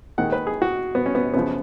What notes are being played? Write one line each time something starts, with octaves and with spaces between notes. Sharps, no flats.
D#2 D#3 G#3 F#5
B4
G#4
F#4
B3
C#4
B3
F#2 C#3 F3 B3